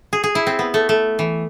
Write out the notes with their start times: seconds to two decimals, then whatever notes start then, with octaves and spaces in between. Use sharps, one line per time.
0.13 G#4
0.24 G#4
0.35 E4
0.47 C4
0.59 B3
0.74 A3
0.89 A3
1.19 E3